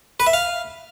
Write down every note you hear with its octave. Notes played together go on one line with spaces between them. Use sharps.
B4
E5
F5